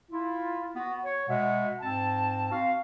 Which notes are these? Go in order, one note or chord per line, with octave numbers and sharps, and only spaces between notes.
E4 F4
B3 F#4
C#5
B2 G#3 E5 F#5
G#2 C4 A5
C4 F#4 F5